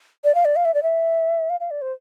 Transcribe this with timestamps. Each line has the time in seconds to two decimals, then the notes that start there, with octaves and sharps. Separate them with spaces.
0.24 D5
0.35 F5
0.45 D5
0.56 F5
0.65 E5
0.74 D5
0.83 E5
1.50 F5
1.60 F5
1.71 D5
1.82 C5